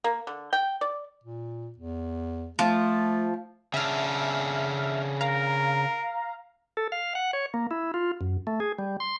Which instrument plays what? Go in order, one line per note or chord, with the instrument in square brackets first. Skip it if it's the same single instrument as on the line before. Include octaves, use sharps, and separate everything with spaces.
[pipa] A#3
D3
G5
D5
[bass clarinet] A#2
E2
[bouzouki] F3 [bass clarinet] A3
[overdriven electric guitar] C#3 D4 [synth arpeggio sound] E5 F6
[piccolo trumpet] A#4 [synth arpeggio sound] F5 A#5
[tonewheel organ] A4
F5
F#5
C#5
A#3
E4
F4
F#2
A3
G#4
G3
C6